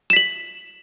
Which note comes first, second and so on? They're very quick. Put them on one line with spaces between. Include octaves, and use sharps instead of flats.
E7 B6 F#7